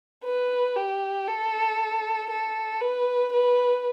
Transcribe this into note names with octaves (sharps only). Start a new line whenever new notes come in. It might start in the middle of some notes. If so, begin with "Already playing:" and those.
B4
G4
A4
A4
B4
B4